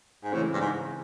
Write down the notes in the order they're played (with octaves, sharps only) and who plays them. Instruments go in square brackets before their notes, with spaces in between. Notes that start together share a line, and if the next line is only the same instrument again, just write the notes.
[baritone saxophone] G#2
[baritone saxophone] A2 [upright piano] C#3 E3 G#3 C4
[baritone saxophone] G2
G#2